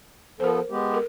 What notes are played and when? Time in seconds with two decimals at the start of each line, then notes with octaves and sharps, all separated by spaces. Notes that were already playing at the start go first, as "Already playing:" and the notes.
0.40 F3 B3 A4 A#4 C5
0.70 G#3 B3 G4
0.92 A4 A#4